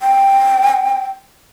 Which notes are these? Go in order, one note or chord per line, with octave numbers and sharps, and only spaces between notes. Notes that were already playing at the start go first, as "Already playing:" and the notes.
G5